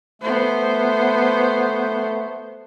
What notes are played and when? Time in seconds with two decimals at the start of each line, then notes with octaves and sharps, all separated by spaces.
0.22 A3 B3 C5